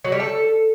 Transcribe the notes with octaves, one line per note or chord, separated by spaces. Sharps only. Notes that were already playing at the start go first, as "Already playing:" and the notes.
F#3
G3
A4